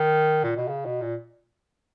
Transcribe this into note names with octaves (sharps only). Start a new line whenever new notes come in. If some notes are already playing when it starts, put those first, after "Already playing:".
Already playing: D#3
A#2
B2
C#3
B2
A#2